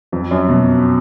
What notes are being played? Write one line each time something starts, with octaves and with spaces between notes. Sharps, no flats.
F2
F#2
B2